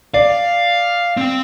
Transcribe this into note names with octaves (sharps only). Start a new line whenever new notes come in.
D5 F5
C4 G5